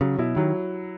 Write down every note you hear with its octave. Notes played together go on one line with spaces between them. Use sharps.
C#3 F#3
B2 E4
D#3 F#3